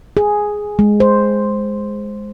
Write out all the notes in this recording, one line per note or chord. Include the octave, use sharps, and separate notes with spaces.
G#4
G#3
C5